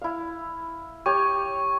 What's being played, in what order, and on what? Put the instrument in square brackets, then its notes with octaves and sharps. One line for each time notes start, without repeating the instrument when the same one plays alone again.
[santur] E4 F5
[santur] G4 C#5 [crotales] C#6